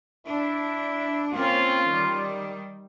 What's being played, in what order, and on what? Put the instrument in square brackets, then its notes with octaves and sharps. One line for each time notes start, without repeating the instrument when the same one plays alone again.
[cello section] D4 [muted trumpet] E4
[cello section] A#3 C4 C#4 [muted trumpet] F4
[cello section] D#3 G3